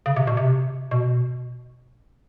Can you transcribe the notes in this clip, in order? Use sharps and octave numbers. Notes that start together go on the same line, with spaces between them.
C#3
C3
B2
C3
B2